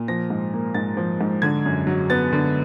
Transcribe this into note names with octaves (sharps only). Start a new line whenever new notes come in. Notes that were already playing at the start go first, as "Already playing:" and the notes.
Already playing: A#2
F3 A#6
G#2
A#3
G#2 A6
F3
G#2
D3 G#6
F#2
F#3
B3 A6
D3